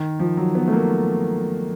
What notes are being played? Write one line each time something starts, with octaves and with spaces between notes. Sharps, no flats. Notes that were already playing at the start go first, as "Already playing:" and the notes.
Already playing: D#3
F3
F#3
B3
A3
A#3